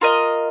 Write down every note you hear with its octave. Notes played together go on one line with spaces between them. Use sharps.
F4 A#4 D#5